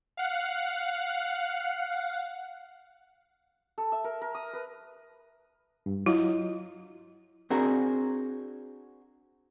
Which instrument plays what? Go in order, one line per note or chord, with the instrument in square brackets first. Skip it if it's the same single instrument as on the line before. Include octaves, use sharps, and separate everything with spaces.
[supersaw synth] F5 F#5
[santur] A4
E5
A#4
A#4
D#6
B4
[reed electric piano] G2
[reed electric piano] F#3 F4 D#5 [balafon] E4
[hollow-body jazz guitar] C4 D4 F#4 G#4 A#4